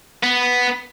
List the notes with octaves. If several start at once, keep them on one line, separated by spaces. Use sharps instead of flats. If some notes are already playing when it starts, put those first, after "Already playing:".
B3